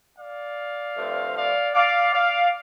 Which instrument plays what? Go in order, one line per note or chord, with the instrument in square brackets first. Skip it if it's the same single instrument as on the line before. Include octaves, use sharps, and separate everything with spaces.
[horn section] D5 F5
G2 F3 A3 C4
D5 F5
D5 F5
D5 F5